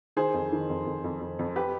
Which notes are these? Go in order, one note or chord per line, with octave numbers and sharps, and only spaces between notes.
D#3 G#4 C5
F2
D#3
F2
F2
F2
F2
F2
G4 B4